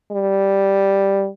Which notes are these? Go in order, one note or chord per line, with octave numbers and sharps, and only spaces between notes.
G3